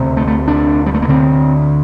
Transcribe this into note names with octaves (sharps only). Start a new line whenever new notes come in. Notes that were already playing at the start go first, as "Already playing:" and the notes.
Already playing: D2 C3
A3
A3
D4
G3
A3
A#3
D2 D3 C4